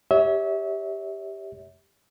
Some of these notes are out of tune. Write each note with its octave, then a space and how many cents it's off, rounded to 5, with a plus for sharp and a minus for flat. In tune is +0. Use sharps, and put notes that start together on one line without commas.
G4 +5 C#5 +15 E5 -30